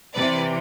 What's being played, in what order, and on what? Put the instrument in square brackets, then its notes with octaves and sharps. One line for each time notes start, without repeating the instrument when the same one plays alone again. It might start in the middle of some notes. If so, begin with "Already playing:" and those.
[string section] C3 E3 B4 D5